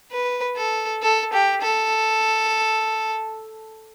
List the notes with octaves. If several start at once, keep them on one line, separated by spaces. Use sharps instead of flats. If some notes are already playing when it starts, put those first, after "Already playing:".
B4
A4
A4
G4
A4